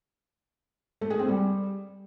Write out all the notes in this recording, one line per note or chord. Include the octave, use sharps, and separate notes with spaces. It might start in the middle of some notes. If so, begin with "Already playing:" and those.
A3
G#4
C4
G3